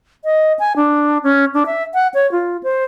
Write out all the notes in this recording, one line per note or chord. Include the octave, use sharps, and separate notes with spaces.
D#5
G#5
D4
C#4
D4
E5
F#5
C#5
F4
C5